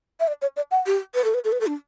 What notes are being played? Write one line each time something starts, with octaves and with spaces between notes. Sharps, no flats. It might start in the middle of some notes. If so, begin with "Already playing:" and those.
E5
D5
C#5
D5
F#5
G4
B4
A4
B4
A4
B4
A4
D4